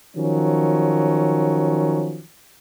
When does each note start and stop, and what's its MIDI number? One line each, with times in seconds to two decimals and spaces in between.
0.16 2.21 51
0.16 2.21 53
0.16 2.21 54
0.16 2.21 61